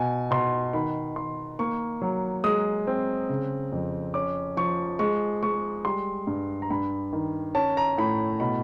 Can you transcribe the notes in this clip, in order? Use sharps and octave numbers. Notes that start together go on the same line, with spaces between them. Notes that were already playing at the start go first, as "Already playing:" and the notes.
Already playing: B2 G#5
B2 C6
D#3 B5
D#3 C6
A#3 C#6
F#3
G#3 D#6
C4
C#3
F2
C#4 D6
F3 C#6
G#3 C#6
G#3 C#6
G3 C6
G2
A#5
G2 B5
D#3
C#4 A5
A#5
A2 B5
B2 B5